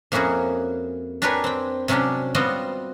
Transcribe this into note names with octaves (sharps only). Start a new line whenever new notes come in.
F2 A#3 C#4 E4 F#4 G#4
D4 G4 A#4 B4 C#5 G#5
C4 G5
C3 F#3 C#4 D4 G4
G3 B3 C4 F4 F#4 D#5